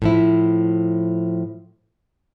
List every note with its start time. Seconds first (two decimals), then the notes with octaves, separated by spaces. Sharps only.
0.02 A2 F3 E4